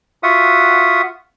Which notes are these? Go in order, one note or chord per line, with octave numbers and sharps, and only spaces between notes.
F4 F#4 E5 F#5 D#6